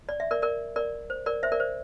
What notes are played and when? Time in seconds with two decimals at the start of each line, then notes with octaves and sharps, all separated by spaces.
0.09 D5
0.20 E5
0.31 A#4 D5
0.42 A#4 D5
0.76 A#4 D5
1.10 C5
1.26 A#4 D5
1.43 C5 E5
1.52 A#4 D5
1.60 C5